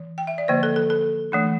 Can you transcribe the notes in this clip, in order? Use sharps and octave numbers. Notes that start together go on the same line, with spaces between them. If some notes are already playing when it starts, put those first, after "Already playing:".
Already playing: E3
G5
E5
D5
D3 F3 A#3 C5
A4
A4
A4
E3 A3 D4